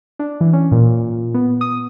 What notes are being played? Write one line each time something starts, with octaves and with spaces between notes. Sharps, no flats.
D4
E3
C#4
A#2
B3
D#6